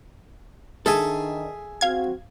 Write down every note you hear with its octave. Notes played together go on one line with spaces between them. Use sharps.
D#3 D4 G#4 A4 E5 G#5
C4 F#4 F5 G#6